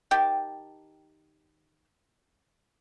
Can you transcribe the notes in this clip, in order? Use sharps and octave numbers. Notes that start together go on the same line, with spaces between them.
D#3 G4 G5 A5